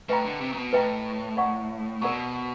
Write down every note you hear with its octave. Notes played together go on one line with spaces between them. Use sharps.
A2 B4 D#5 G5 A#5
D3
C3
A#2
B2
A2 B4 D#5 G5 A#5
A#4 D5 F#5 A#5 C#6
B2 A#4 D5 F#5 A#5 C#6